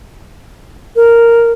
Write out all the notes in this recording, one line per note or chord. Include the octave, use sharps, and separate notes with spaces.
A#4